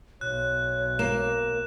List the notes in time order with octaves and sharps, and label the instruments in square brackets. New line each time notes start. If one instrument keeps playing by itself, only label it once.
[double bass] B1 [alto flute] C#5 [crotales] F#6
[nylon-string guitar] A#3 [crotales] E7